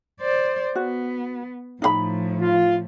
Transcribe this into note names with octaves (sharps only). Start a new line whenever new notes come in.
C5 D5
B3 F#4
A2 F3 D#4 F5 B5
F4